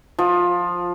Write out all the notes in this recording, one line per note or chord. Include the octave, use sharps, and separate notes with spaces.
F3